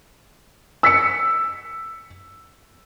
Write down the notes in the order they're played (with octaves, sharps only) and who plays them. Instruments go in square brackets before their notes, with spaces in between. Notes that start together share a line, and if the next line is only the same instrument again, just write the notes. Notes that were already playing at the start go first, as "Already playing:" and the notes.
[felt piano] E6 B6 C#7